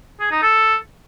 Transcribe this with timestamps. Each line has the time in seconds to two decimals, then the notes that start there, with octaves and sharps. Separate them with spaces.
0.20 G#4
0.31 D#4
0.42 A4